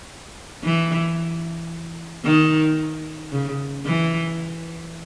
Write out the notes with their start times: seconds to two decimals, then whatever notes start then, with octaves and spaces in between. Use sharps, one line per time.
0.64 E3
2.24 D#3
3.32 C#3
3.85 E3